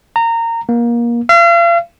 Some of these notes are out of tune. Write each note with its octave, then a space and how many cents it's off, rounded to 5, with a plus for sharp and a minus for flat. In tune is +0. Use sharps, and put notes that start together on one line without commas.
A#5 -20
A#3 +25
F5 -40